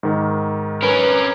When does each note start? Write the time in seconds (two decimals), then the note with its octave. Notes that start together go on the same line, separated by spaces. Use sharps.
0.03 G#2 D#3
0.82 C#4 A#4 B4